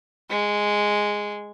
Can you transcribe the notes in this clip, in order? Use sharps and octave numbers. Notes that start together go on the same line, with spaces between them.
G#3